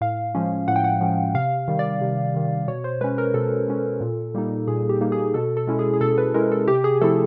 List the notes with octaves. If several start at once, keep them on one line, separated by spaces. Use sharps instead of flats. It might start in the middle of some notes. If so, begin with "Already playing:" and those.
A2 F5
F3 G#3 C#4
A2 F#5
G5
F#5
F3 G#3 C#4
C3 F5
D#3 G3
D5
C3
D#3 G3
B2 C#5
C5
G#3 C#4 B4
A#4
B2 A4
G#3 C#4
A#2
G3 A#3 D#4
A#2 G#4
G4
G3 A#3 D#4
G#4
B2 A4
A4
G#3 C#4 E4
G#4
G#4
B2 A4
B4
G#3 C#4 E4 A#4
A4
C3 G4
G#4
F3 A3 C4 E4 A4